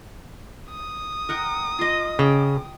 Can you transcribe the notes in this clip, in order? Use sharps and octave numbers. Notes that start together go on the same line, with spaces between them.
D#6
A#4 F#5 G5
F4 D#5
C#3 G5